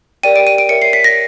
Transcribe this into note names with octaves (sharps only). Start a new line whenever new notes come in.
G4 A#4 D5 G5 D#7
D7
D#7
D7
A#4 C#5 E5 C#7
C7
B6
A#6